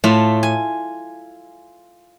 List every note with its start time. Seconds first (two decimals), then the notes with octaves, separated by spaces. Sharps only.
0.04 A2 A3 F4
0.43 G#5